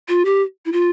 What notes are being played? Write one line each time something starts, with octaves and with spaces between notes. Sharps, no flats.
F4
G4
E4
F4